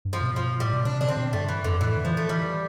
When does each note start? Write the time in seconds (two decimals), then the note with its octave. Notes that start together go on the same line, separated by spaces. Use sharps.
0.05 G2
0.13 F3
0.21 B2
0.36 F3
0.60 A2 G3
0.73 B2
0.85 C3 D4
1.01 D3 D4
1.09 C4
1.17 B2
1.33 G2 A3
1.49 E3
1.64 F2 D3
1.81 A2 E3
1.97 D3
2.05 E3 F3
2.17 A3
2.29 E3 G3